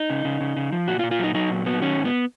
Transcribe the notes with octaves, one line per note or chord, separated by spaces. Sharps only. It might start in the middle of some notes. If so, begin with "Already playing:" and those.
Already playing: D#4
C#3
C#3
C#3
C#3
F3
A#2 F#4
F4
A#2
F4
F#3 D#4
F#3 D#4
A#2
F#3 B3
D#3 C#4
G#2
B3